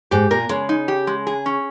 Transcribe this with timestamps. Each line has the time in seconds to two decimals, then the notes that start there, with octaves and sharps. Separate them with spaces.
0.11 G#2 G4
0.31 A#2 A#4
0.49 C#3 G#3
0.69 D#4
0.88 G4
1.07 G#3
1.27 G#4
1.46 C#4